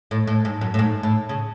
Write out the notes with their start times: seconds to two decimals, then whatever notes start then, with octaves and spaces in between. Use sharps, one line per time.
0.11 A2
0.27 A2
0.45 G#2
0.61 F#2
0.74 A2
0.79 G#2
1.03 A2
1.29 C#3